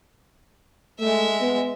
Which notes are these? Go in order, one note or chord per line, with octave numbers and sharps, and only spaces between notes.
G#3 A3 E5
B3